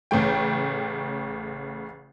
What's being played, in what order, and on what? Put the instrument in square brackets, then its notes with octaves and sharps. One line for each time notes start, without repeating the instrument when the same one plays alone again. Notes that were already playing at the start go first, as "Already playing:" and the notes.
[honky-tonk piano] A1 C#3 A3 G5